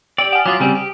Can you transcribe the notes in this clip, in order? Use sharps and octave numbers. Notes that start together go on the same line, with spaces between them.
G4 D5 G5 D7 F#7
F#5 G#5
F#3 F4 D6 D#6
C#3 G3 C4 G#5
G4